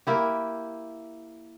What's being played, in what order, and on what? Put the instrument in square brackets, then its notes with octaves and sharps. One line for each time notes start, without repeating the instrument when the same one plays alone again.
[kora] A#3 E4 G4